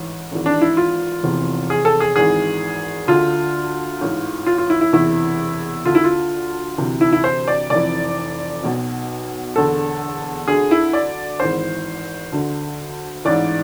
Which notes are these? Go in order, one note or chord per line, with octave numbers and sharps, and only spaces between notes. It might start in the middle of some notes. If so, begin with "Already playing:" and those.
Already playing: A1 G#2 E3
G#1 G#2 E3
D4
E4
F4
F1 E2 C3 E3
G#4
A4
G#4
G#1 G#2 E3 G#4
D2 D3 F4
A1 G#2 E3
F4
F4
E4
E4
E1 E2 C3 E3 E4
D2 D3 F4
E4
F4
D2 C3 E3
E4
E4
C5
D5
F1 F2 E3 D5
B1 B2
E1 E2 D3 A4
D2 D3 G#4
E4
D5
G#1 G#2 E3 C5
D2 D3
A1 G#2 E3 D5